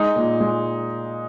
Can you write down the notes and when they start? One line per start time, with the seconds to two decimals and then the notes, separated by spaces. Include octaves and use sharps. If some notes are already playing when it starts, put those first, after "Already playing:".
Already playing: G#3 D#4
0.16 A#2
0.40 G#3